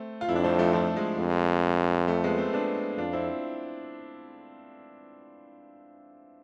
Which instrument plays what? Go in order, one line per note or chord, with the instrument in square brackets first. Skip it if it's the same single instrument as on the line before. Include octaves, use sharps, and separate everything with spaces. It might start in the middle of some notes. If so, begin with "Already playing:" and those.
Already playing: [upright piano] A3 C4
F4
[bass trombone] F2 [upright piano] E4
[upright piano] D4
A3 C4
F3 A3
F3 A3
G#3
[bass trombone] F2
[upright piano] F3 A3
G#3 B3
A3 C4
B3 D4
[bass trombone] F2 [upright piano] D4 F4
[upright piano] C4 E4